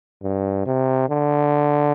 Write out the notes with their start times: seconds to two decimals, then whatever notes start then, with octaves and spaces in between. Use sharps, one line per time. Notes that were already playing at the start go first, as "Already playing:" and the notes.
0.23 G2
0.66 C3
1.09 D3